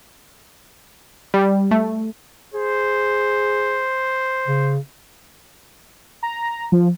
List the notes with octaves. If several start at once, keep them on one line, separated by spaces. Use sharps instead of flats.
G3
A3
G#4 C5
C#3
A#5
F3